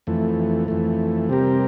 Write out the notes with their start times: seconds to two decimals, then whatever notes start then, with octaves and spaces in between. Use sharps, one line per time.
0.07 F2 E3 A3
0.68 F2 E3 A3
1.29 C3 G3 C4 G4 A#4